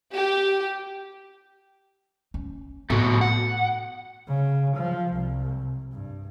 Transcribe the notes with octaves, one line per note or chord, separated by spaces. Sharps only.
G4
C#4
A2 A3 B3 F#4
F#5
C#3
F3
C2
G2